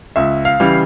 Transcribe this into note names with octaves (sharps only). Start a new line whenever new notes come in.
C#2 E5
F5
C#3 E3 G3